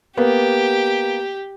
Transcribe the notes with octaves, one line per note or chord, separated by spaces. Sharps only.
A#3 B3 G4